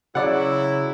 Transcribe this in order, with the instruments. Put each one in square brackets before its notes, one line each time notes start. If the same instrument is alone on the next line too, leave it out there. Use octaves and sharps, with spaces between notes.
[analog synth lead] C#3 [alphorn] F#3 [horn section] E4 [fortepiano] D5 F#5